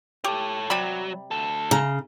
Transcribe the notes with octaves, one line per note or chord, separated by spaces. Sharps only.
G4 A4 C#5
C3 F#3 G3 B5
D2 A4
C#3 A#5